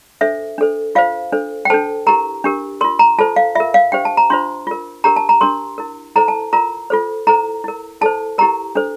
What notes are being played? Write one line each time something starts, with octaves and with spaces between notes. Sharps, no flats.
D4 A4 C5 E5
D4 A4 C5
F4 C5 F5
D4 A4 C5
G5
D4 A4 C5 A5
E4 G4 A#4 A#5
D4 G4 A#4
F4 A#4 C6
A#5
F4 A4 C5 A5
F5
F4 A#4 E5
F5
D4 G4 C5 G5
A5
A#5
D4 F4 C5 C6
F4 A#4
D4 G4 A#4 A#5
A5
A#5
D4 G4 A#4 C6
E4 A#4
E4 A4 C5 A#5
A5
F4 A#4 A#5
F4 A4 C5
E4 A4 C5 A#5
E4 A#4
E4 A4 C5 A5
E4 G4 A#4 A#5
D4 A4 C5